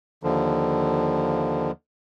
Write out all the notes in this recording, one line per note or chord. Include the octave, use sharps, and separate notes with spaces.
D#2 D3 F3